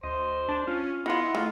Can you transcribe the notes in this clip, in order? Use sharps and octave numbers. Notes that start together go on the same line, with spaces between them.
D2 C5 D#5
D4 D5 A5
C#4 F4
D#3 B3 E4 F4 D#5 F#5 C6
D#3 A3 F4